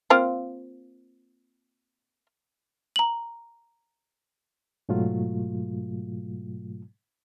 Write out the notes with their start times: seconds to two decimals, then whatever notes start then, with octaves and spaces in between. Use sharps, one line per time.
0.10 A#3 C4 F4
2.96 A#5 F#7
4.89 G#2 B2 F#3 A3 F4